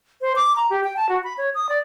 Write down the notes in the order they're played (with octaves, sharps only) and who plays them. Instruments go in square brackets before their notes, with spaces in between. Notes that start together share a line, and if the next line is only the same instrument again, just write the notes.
[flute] C5
D6
A#5
G4
G5
A5
F#4
B5
C#5
D#6
D5